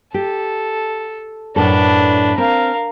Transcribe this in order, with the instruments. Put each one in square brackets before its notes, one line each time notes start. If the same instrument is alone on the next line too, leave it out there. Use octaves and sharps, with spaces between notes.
[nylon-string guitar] G4 [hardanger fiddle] A4
[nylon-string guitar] F#2 A2 A4 [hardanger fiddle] D4 B4
[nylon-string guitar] C4 [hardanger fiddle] A#4 F5